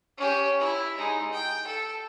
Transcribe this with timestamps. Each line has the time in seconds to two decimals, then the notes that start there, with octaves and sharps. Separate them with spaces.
0.18 C#4 G4
0.60 E4
0.97 G#3 D#4
1.33 G5
1.67 A4